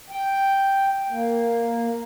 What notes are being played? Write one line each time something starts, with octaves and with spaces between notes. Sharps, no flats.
G5
A#3